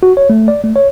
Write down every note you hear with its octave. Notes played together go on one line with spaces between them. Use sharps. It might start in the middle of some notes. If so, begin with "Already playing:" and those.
F#4
C#5
A3
D5
A3
C#5